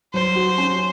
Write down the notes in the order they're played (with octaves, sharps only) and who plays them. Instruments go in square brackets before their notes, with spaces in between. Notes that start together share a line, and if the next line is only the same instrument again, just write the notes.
[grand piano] F#3 [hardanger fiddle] C5
[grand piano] F#4
C#4